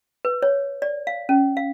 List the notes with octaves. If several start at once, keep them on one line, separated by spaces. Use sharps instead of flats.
B4
C#5
D5
F5
C#4
F5